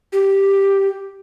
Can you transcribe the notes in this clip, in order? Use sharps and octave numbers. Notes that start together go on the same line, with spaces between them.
G4